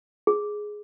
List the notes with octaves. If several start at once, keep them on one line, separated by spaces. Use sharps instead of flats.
G#4